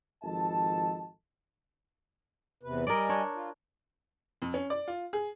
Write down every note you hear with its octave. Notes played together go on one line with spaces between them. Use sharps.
G#1 F3 A4 D#5 A5
E2 C3 B4
G3 A#4 D5 D#5 G#5
D4 C#5
F4
F2
C#4
D5
F4
G#4